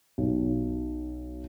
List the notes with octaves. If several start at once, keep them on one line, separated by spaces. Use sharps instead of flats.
B1